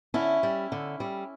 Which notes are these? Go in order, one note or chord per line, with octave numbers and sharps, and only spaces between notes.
D3 C#4 E4
G3
D3
G3